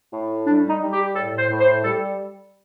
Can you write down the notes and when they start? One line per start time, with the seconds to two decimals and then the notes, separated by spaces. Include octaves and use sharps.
0.11 A2
0.46 G3 D4
0.69 D#4
0.81 G3
0.93 G4
1.15 A2 A4
1.38 C5
1.50 A2
1.60 C5
1.84 G3 A4